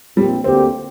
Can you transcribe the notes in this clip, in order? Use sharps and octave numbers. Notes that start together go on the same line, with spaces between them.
A#1 A#2 F3 G3 C4
D2 D3 A#3 C4 G4